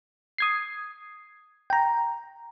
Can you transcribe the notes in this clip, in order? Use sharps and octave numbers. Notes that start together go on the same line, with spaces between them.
D#6 G#6 C7
G5 A#5